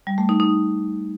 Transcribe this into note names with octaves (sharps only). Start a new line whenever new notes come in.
G3
A3
D#4
D#4